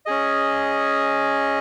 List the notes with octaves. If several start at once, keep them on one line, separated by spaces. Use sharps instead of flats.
C#4 G#4 D#5